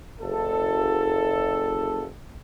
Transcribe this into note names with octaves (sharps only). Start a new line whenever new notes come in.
F#1 A4